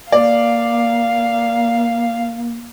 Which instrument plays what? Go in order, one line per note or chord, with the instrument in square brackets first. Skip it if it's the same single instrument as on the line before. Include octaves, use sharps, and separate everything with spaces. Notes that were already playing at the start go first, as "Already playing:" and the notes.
[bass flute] A#3 [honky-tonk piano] D5 [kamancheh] F5